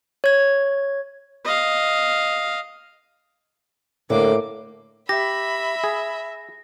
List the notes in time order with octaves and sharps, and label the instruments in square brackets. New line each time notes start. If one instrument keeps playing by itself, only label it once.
[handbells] C#5 G#6
[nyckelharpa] D#5 F5
[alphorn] A2 [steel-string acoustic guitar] D3 [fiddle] A#3 D6
[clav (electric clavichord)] G4 [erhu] E5 [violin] B5 [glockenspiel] A#6
[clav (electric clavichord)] G#4